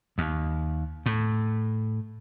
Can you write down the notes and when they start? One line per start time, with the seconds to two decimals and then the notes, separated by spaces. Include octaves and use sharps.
0.18 D#2
1.06 A2